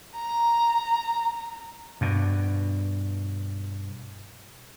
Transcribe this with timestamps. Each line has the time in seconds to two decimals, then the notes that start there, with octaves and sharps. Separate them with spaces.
0.16 A#5
2.01 G2 B2